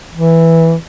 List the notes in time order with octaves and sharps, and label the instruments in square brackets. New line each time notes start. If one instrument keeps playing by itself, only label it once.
[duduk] E3